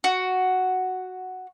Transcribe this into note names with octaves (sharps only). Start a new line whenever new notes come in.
F#4